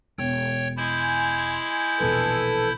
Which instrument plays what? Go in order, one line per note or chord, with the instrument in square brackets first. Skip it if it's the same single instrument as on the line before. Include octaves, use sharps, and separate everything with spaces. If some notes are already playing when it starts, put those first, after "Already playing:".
[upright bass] E1 [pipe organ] C#5 G5
[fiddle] G#3 G#5 [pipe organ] E4 G6
[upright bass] E1 A#1 [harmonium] A4 B4